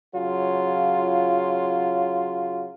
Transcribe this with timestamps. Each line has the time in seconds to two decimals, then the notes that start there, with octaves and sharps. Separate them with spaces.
0.14 C#3 F#3 F4